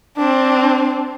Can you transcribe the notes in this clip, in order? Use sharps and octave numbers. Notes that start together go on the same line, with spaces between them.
C4 D4